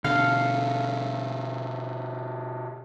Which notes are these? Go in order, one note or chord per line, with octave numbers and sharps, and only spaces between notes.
B2 D3 A4 F5 F6